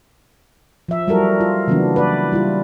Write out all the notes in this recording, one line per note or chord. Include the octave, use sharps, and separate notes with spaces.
F3 E5
F#3 G3 E4 F#4 A4 A#4
F4
C#3 E3 F#3 A#3 B3 D4
B4 D5
G3 E4 F4